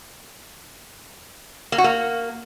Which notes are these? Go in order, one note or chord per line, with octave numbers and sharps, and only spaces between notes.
A#3
F#4
A#3